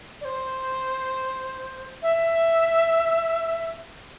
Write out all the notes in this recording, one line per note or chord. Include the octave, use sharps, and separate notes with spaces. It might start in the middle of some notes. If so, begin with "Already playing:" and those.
D5
C5
E5